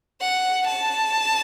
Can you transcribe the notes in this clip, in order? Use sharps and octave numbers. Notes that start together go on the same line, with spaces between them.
F#5
A5